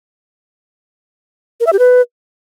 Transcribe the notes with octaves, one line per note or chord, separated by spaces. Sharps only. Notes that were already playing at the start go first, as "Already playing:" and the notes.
A#4
E5
G4
B4